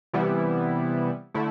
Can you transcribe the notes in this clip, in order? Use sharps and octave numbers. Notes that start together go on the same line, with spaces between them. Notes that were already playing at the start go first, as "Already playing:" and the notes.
C3 E3 G3 B3 E4
D3 A3 E4